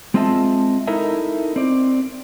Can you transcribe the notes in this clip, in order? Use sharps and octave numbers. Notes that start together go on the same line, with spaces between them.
G#3 C4 F4 D#5 E5 A5
D#4 E4 A4 A#4 D#5 E5
C4 D5